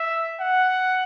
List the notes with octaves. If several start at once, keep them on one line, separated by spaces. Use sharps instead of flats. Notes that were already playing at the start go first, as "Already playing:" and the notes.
Already playing: E5
F#5